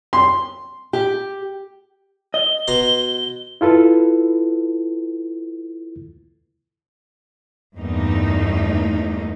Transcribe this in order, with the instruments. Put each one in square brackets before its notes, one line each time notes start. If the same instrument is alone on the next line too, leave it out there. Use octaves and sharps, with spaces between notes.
[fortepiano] C6
[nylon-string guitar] G4
[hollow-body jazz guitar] D#5 [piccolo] G7
[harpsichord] B2 A#5 C6
[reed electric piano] E4 F4 A4 B4
[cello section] E2 G2 A3 A#3 D#4